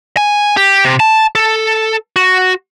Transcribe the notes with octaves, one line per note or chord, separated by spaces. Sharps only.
G#5
G4
C3
A5
A4
F#4